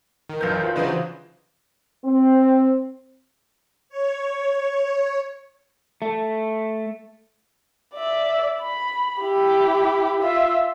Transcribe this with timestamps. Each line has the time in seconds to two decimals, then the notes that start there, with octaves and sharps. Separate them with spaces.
0.29 D#3
0.41 A1 F#2 B4 F5 G6
0.64 F4 C5 F5
0.76 C#3 E3 F#3 D4 D#4 B4 C5
2.05 C4
3.89 C#5
6.02 A3
7.95 D5 E5
8.61 B5
9.21 E4 G4
10.21 F4 E5